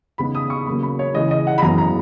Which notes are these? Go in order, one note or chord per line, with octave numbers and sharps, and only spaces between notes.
C#3 G#3 B3 D#4 B5
D#6
C#6
C#3 F#3 A#3 C#4 B5
B5
C#5
C#3 E3 G#3 D#5
D#5
F#5
B5
F#2 E3 G#3 B3 A#5
A#5